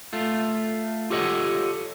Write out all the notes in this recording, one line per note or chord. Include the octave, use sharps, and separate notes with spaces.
A3 F4
F4 G4 A4 C#5 D#5 F#5